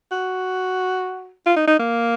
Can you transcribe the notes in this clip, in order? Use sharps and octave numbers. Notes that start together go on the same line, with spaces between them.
F#4
F4
D#4
D#4
A#3